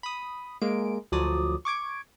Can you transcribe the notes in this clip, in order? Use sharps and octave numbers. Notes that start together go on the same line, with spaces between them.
B5 D#6
G#3 A#3 D7
D2 F3 F#3 D5 D#6
C#6 D6 G#6 D7